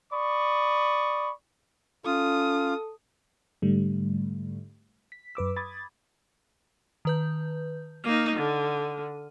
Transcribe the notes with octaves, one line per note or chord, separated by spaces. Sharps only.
D5 B5 C#6 D#6
C#4 F4 A4 D#6
G#2 D3 G3 A3
B6
F#2 B4 D6 E6
B5 D6 D#6 G#6 A6
D#3 B4 G6
A#3 D#4 F6 D#7
D3